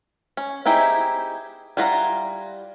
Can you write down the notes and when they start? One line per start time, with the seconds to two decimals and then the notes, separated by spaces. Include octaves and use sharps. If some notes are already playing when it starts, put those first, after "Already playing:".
0.37 C#4
0.66 C4 D#4 E4 G4 G#4
1.77 G3 E4 F4 F#5 A#5